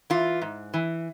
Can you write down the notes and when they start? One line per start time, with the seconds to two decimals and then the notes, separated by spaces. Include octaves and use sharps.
0.10 E3 F4
0.41 G#2
0.74 E3